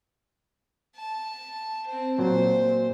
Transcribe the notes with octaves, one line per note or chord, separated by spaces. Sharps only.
A5
C4 C5
A#2 F#3 C5